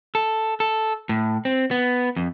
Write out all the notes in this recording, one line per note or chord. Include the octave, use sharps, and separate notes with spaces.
A4
A4
A2
C4
B3
F2